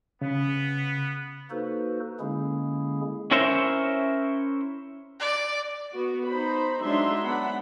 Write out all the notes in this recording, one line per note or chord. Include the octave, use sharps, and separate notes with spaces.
C#3 B3
A#3 D#4 F#4 A4 B4 C5
D3 G#3 A#3 C#4 E4 G#4
C#4 E4 A#4 C5 C#5 E5
D5
B3 F#4
D#4 C5 B5
F#3 G#3 D4 D#4 E5 C6
B3 D4 F#5 B5